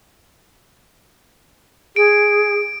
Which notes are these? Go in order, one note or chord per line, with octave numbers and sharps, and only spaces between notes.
G#4 D7